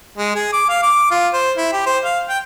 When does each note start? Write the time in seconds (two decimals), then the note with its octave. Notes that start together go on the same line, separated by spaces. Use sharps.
0.18 G#3
0.35 G#4
0.53 D6
0.69 F5
0.83 D6
1.11 F4
1.33 C5
1.57 E4
1.73 G4
1.86 C5
2.04 F5
2.29 G5